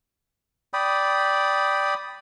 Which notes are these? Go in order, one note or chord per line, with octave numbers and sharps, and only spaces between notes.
D5 G5 B5 D#6